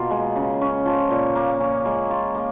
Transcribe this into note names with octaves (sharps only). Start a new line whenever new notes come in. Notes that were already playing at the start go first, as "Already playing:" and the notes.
Already playing: B2 A#3 F4
G#3
C#3
C#4
F3
A#2
A#3
C#4
G#3
F4
A#3